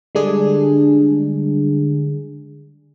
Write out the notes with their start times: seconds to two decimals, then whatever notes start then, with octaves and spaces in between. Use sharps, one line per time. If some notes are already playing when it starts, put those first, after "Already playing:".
0.15 D3 G3 G#3 D4 G#4